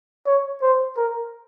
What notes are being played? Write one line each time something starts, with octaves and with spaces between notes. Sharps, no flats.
C#5
C5
A#4